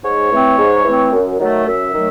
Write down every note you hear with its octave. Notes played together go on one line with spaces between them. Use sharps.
G#2 C#5
E3 A3 C4
G#2
E3 A3 C4
F#2
D#3 F#3 A3
F#2 E5
D#3 F#3 A3